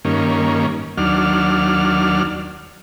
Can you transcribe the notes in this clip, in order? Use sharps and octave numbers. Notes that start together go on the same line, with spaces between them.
G2 D#3 A#3 C#4
D#2 F#3 D4 F6